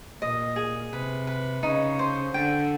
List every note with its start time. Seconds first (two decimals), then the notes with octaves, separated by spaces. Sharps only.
0.21 A#2 D#5
0.56 G#4
0.92 C3 B4
1.27 B4
1.63 C#3 D#4
1.99 C5
2.34 D3 G5